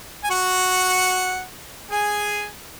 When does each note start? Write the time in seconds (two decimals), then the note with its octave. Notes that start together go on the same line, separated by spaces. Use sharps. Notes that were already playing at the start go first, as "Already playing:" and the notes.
0.24 G#5
0.31 F#4 F#5
1.91 G#4 G#5